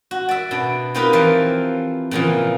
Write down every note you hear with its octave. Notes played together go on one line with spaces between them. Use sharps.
F#4
D5 E5
B2 D4
C4 D#4 F4 G4 A#4 B4
E3 F3 C5 D5
A#2 C#3 E3 F3